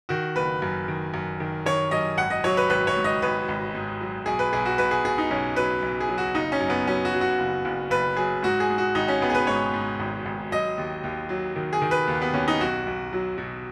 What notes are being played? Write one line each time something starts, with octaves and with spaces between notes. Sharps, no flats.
D#3 F#4
F#1 B4
F#2
D#3
F#2
D#3
D#3 C#5
F#2 D#5
G#1 F#5
D#5
F#3 C#5
B4
G#1 B4
C#5
G#2
D#5
G#1 B4
G#1
G#2
F#3
B1 G#4
B4
B1 G#4
F#4
B1 B4
G#4
B2 G#4
D#4
B1 C#4
F#3 B4
B1
G#4
F#3
F#4
F#1 D#4
C#4
F#2
B3
F#3 C#4
F#4
F#3
F#4
F#1
F#1
F#1 B4
F#3 G#4
G#2 F#4
G#4
G#2
F#4
G#1 D#4
C#4
G#1 B3
G#4
B4
G#2 C#5
G#2
G#1
G#1
F#3 D#5
D#2
D#2
F#3
D#3
G#4
D#3
B4
D#2
B3
D#2 C#4
D#4
B1 F#4
B1
F#3
B2